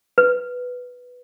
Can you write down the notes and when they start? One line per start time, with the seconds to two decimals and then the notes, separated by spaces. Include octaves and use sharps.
0.18 B4